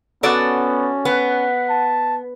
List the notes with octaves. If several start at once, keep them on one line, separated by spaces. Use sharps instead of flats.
B3 C#4 F#4 A4 D5
B3 F#5
A5